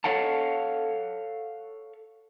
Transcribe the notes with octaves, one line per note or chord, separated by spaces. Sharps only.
A4 C#5 F5 F#5 A5